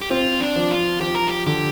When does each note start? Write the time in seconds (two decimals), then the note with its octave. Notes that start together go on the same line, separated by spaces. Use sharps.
0.01 G4
0.10 C4 F4
0.40 D4
0.56 F3
0.71 F4
1.00 F3 G4
1.15 A#4
1.28 G4
1.46 D3 G4